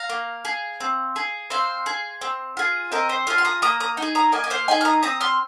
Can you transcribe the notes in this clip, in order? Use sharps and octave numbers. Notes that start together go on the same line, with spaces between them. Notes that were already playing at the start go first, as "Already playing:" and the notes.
Already playing: F5 A#5
A#3
G#4
C4
G#4
C4 C5 F5
G#4
C4
F4 G#4
C4 A#4 D#5
C5
F4 G#4 C5 F5
C6
A#5 D#6
A#3 A#5 D#6
A#5 D#6
D#4
G#4
A#5 D#6
A#3 D#5 G#5
D#5
C5 F5
D#4 G#4 D#5 G#5
F6
A#5 D#6
C4 A#5 D#6
C6 F6